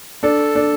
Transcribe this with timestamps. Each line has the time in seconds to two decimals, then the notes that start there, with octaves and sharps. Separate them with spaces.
0.23 D4 A4
0.55 D4